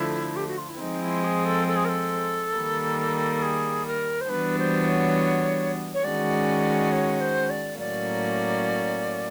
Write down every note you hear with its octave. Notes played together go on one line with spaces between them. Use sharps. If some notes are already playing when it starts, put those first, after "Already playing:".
Already playing: D3 F3 A3 E4
G4
F#4
F4
E4
F3 G#3 C4 D#4
E4
G#4
A4
A4
G#4
A#4
A4
D#3 G3 A#3
G#4
A#4
C5
E3 G3 B3 D4 F#4 B4
C5
C#5
C#5
D#3 G#3 C#4 F#4 D5
C#5
C5
D5
A2 F#3 A#3 C#4 D5